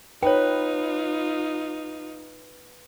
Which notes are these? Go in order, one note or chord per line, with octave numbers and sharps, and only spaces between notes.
D#4 F4 B4 C#5 G5